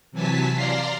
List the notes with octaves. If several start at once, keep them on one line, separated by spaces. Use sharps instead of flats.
C3 E3 F#3 G#5 A5 B6
D5 F5 A#5 C6 A#6 C7